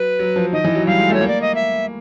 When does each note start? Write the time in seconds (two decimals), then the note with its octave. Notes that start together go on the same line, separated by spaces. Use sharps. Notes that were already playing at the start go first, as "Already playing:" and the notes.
Already playing: F#3 B4
0.19 F#3
0.36 F3
0.53 D#3 D#5
0.64 E3
0.75 F#3
0.87 G3 F5
0.99 G#3
1.10 A3 C#5
1.21 A#3
1.28 D5
1.41 D#5
1.55 E5